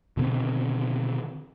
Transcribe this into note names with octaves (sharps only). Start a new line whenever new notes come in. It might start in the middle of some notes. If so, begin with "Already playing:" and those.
B2 D3 D#3 C4